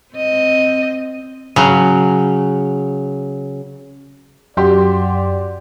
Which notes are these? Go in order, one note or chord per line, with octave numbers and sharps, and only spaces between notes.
C4 D#5
C#3 F#3
F#2 F#4 G4 D5 C6